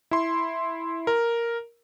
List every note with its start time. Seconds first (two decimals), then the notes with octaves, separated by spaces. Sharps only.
0.11 E4 C6
1.07 A#4